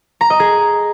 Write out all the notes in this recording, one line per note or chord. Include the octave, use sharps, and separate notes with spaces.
A#5
D#5
G#4